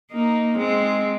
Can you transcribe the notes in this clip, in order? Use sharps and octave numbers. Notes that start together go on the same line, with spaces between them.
A#3 D#4
G#3 C4